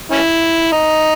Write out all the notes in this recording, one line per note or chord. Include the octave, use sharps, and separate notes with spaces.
C#4 E4
D#4